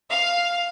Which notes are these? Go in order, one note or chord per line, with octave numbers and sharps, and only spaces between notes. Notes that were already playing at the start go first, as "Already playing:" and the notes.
F5